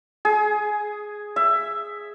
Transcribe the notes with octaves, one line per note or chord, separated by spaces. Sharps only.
G#4
E5